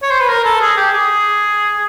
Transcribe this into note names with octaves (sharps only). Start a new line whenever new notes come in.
C#5
C5
B4
A#4
A4
G#4
G4
G#4